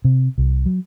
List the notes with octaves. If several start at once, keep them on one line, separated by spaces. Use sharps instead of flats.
C3
C2
F#3